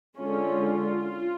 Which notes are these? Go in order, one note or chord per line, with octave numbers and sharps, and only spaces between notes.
D3 G#3 C#4 F4